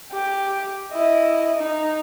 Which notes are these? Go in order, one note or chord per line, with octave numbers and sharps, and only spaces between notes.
G4
E4 D#5
D#4